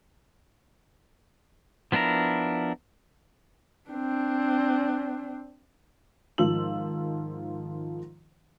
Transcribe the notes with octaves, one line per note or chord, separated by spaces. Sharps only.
F3 B3 D4 E4 A#4
C4 D4
G#2 D#3 F3 F4 E6 F#7